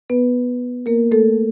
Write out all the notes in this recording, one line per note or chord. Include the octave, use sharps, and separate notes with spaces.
B3 B4
A#3 A#4
A3 A4